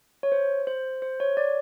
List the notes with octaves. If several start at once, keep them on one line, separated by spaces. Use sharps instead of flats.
C#5
C5
C5
C5
C#5
D5